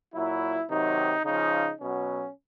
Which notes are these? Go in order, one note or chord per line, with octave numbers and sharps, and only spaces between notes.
A#2 F#3 E4
C3 D#3 F#3 D#4
C#3 F3 D#4
B2 F#3 C#4